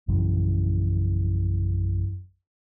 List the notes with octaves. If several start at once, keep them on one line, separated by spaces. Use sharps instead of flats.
A#1 F#2 C#3 E3